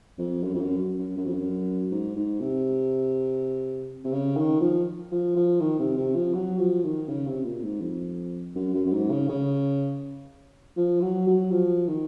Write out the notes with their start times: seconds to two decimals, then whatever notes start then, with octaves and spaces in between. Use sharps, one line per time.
0.18 F2
0.43 F#2
0.54 F2
0.61 F#2
0.98 F#2
1.17 F#2
1.26 F2
1.35 F#2
1.91 G#2
2.16 G#2
2.40 C3
4.04 C3
4.12 C#3
4.37 D#3
4.61 F3
5.11 F3
5.36 F3
5.60 D#3
5.79 C3
5.97 C3
6.15 F3
6.34 F#3
6.58 F3
6.84 D#3
7.08 C#3
7.27 C3
7.44 A#2
7.63 G#2
7.81 F2
8.55 F#2
8.74 F#2
8.86 F#2
8.93 G#2
9.11 C#3
9.29 C#3
10.77 F3
11.01 F#3
11.27 F#3
11.51 F3
11.87 D#3